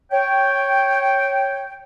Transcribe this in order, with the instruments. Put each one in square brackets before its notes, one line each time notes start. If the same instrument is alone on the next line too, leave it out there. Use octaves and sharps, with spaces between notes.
[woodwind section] C#5 G5